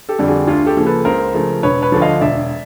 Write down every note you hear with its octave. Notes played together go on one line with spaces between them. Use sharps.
G4 A4
F2 D3 G3
F#4 G#4
D2 F4 G4
G4 A4
C#3 F3 A#3
A4 B4
C#2 A#4 C5
C#3 F3 A3
E1 B4 C#5
B4 C#5
D2 D3 F3
D#5 F5
E1 D5 E5